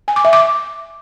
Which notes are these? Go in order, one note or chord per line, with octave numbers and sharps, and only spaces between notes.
G#5
D6
E5
D6